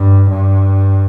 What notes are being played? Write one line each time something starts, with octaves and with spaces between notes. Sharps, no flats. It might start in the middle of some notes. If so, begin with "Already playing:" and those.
Already playing: G2
G2